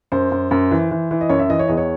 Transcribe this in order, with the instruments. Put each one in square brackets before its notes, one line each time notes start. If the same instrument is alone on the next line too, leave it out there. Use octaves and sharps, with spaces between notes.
[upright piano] F#2 C5
F#2
F#2
E3
E3
E3
D#5
F#2 C#5
E5
E3 D#5
C#5
E2 D#5
C#5